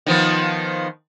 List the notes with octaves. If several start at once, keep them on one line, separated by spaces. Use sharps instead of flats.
D#3 F3 B3